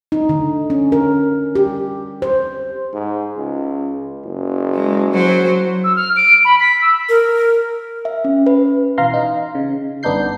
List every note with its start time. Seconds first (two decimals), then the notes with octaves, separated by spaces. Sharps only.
0.12 D#4
0.29 D3
0.70 C#4
0.92 A#4
1.55 G4
2.22 C5
2.93 G#2
3.37 C#2
4.25 F#1
4.74 G#3
5.11 F#3 C5
5.84 E6
5.96 F6
6.16 D7
6.45 B5
6.60 B6
6.82 E6
7.09 A#4
8.05 E5
8.24 C#4
8.46 B4
8.98 B2 E3 F5 A#5 C6
9.14 D#4
9.55 C#3
10.03 G1 B3 D4 D#4 G6 C7